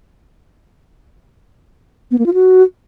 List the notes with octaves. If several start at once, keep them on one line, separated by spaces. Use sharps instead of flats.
B3
A#3
F4
F#4